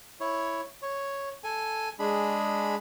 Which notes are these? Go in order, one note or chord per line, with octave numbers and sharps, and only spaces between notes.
E4 C#5
C#5
A4 G#5
G#3 D4 G#4 B5